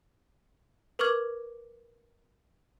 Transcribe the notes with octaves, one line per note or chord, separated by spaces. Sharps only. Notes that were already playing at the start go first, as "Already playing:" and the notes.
A#4 B4 C#6 D6 F6 G#6